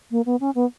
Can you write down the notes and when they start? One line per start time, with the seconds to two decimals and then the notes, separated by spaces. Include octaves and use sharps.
0.11 A#3
0.26 B3
0.40 C#4
0.55 B3